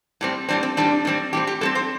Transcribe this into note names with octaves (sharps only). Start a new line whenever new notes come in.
A2 G3 C4
A2 G3 C4 D4
C4
A2 G3 C4 D4
A2 G3 C4
A2 G3 C4 G4
G4
A2 G3 C4 A4
C5